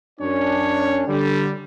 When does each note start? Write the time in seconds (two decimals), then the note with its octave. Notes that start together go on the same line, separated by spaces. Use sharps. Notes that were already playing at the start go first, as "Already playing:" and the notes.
0.20 F#2 C#4 D4 C#5
1.07 D3 G3